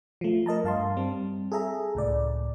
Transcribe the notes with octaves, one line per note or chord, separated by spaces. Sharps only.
F3 A3
A#4 D#5 A5 A#5
G2 F5 A5 C6
G3 C4
G#4 A4 E5 A#5
C#2 A2 D5